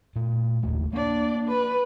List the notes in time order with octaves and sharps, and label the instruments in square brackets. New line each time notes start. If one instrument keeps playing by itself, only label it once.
[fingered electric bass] A#2 A3
F#1 D#2 A3
[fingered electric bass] A#3 [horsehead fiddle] D4 D5
[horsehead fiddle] B4